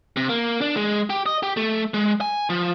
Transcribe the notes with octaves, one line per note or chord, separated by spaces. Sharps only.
C3
A#3
D4
G#3
G4
D#5
G4
A3
G#3
G#5
F3